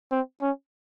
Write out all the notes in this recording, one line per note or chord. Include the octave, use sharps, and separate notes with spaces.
C4
C#4